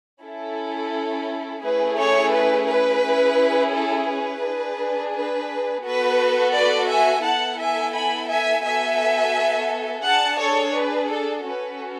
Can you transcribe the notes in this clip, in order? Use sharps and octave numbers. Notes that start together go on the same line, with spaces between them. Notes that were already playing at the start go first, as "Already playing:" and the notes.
C#4 E4 A4
A3 C#4 E4 G#4 B4
A4 C#5
B4
B4
C#4 E4 G#4
A4
B4
D4 G#4
B4
B3 F#4 A4 B4
B4 D5
E5 G#5
B3 E4 A4 F#5 A5
E5 G#5
G#5 B5
E5 G#5
B3 F#4 A4 E5 G#5
D4 G#4 F#5 A5
A4 C#5
B4
A4
C#4 F#4 A4 B4